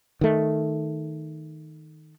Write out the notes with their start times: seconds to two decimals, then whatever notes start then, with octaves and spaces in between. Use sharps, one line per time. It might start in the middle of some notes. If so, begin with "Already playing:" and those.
0.21 D#3 A3